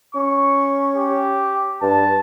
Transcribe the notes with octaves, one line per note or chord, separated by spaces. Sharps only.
C#4 C#6
G4
G2 A5